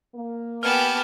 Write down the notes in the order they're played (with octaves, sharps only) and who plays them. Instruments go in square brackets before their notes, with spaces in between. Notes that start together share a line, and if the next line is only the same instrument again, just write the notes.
[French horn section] A#3
[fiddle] B3 G4 [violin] G#5 A5 [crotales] F6 C#7 F#7